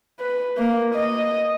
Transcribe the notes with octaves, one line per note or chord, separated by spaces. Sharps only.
B4
A#3
D#5